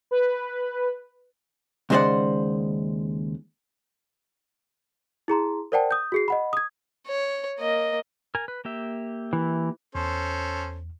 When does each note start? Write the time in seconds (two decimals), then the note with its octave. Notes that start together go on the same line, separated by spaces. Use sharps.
0.11 B4
1.90 D#2 C#3 G#3 C5 D5 F#5
5.28 E4 G#4 A#5 C6
5.72 A#4 C5 D5 F#5 G5 A5
5.91 D#6 G6
6.12 F#4 G#4 C7
6.28 D#5 F#5 B5
6.53 D#6 G#6
7.07 C#5
7.59 A#3 D#5
8.35 A#4 G#5
8.48 B4
8.65 A#3 G4 E5
9.33 E3
9.95 E2 C#4 A4 C5